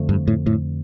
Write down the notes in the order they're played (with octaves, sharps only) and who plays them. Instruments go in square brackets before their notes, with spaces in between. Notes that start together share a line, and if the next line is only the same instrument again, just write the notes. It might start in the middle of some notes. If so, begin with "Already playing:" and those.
Already playing: [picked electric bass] F2 D3 F3 A3
[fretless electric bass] G2
A2
A2